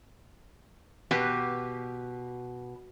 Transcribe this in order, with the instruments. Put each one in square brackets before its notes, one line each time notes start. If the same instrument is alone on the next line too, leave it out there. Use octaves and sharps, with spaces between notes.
[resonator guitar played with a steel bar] B2 [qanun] G4 B4